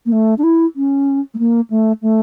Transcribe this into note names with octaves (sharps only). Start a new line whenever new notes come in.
A#3
A3
D4
E4
C#4
A3
A#3
A3
A3